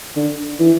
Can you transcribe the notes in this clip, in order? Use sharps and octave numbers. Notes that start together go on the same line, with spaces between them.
D3
E3